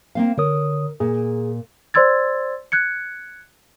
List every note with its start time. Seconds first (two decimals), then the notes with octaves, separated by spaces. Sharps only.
0.15 A#3 C4 F5
0.38 D3 A#4 C#5 D#6
1.00 A#2 G#4
1.94 C5 D5 C6 E6 G#6 A6
2.72 F#6 G#6 C#7